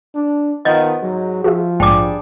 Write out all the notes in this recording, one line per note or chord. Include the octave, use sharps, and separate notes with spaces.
D4
D#3 F3 B3 D#5 G6
G#2 F#3
F3 F#4 G#4 E5
A#1 G#2 G3 D4 G#4 G5 D6